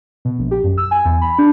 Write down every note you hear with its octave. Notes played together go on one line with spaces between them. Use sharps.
B2
A#1
G4
F#2
E6
G#5
E2
B5
D4